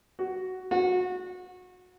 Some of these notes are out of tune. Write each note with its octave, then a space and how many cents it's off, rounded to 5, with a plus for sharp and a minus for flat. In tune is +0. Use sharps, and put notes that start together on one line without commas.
F#4 +5
F#4 -25